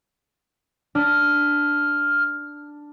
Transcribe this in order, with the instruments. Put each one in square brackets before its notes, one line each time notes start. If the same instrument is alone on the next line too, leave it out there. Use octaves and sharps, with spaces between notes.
[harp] D4 [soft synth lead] F6